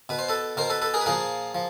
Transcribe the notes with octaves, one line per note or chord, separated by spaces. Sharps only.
B2 B4
C5
A4 B4
B2 A#4 C5
A4 B4
A4 B4
G#4 A#4
B4
A#2 F3 G#4 A#4
F3